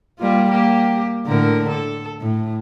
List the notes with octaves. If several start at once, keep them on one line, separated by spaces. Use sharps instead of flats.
G3 A#3 F4
A#3 G4
A2 D3 A#4
A4
A2